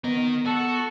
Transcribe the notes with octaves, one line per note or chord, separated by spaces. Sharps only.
B3 A#4 D#5
F#4 A4